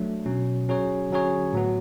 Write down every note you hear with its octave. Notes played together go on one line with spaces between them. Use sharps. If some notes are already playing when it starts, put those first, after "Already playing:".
Already playing: F#3 A3 D4
B2 F#3 C#4
F#3 C#4 G#4 C#5
D3 F#3 C#4 G#4 C#5
A2 F#3 B3 F#4